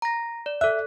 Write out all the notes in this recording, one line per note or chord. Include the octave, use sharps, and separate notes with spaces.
A#5 A#6
D5
A4 E5 F#6